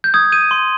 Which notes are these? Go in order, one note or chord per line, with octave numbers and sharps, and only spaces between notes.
G6
D#6 G#6
G6 D#7
C6